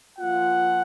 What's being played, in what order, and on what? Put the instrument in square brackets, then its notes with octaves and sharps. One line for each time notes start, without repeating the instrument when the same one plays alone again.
[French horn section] F3 A#3 F4 [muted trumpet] F#5